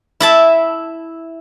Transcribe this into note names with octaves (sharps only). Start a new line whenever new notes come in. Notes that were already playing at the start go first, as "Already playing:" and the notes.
E4 E5 A5